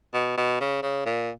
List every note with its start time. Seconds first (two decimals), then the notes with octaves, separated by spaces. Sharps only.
0.14 B2
0.37 B2
0.61 C#3
0.83 C#3
1.06 A#2